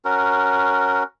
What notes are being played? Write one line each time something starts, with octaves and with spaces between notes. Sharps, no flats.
C#4 F#4 A#4